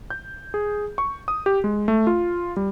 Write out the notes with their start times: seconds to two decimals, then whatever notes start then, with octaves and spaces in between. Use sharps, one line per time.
0.10 G6
0.54 G#4
0.98 C#6
1.28 D#6
1.46 G4
1.64 G#3
1.88 A3
2.07 F4
2.57 G3